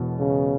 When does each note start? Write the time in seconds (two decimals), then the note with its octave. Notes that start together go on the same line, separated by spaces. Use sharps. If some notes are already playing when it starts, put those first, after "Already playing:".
Already playing: E1 E2 B2
0.19 C#3